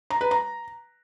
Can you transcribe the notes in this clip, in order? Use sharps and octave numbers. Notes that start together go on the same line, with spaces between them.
A#5
B4
A#5